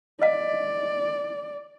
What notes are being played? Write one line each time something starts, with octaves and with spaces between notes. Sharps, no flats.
D5 D#5 F5